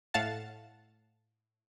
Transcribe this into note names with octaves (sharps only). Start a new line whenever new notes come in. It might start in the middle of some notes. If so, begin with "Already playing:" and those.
A2 F5 F#5 A5 A6